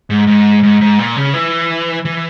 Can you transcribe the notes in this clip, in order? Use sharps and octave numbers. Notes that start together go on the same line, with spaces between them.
G#2
G#2
G#2
G#2
A#2
C#3
E3
E3